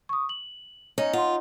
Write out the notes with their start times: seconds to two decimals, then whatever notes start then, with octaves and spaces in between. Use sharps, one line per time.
0.09 C#6 D#6
0.29 F#7
0.98 C#4 D#4
1.13 F4 F#5 C6